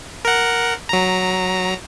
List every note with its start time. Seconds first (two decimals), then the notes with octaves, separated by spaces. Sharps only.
0.25 A#4 F#5
0.89 F#3 A#5